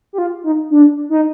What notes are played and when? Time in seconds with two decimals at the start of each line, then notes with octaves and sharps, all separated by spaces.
0.13 G4
0.18 F4
0.44 D#4
0.70 D4
1.09 D#4